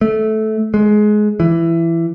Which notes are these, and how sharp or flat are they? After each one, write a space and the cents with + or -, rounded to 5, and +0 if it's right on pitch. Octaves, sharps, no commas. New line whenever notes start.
A3 -15
G#3 +20
E3 +15